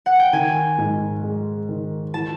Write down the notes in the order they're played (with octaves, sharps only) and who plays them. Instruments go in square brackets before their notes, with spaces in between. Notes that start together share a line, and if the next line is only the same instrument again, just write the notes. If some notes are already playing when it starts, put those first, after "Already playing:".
[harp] F#5
G5
[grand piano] D#3 [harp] G#5
[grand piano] G#2
G#3
D#3
[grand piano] E3 [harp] A5